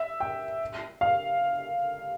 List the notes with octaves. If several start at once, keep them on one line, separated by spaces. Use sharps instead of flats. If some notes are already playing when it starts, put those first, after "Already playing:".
Already playing: E5
G5
F5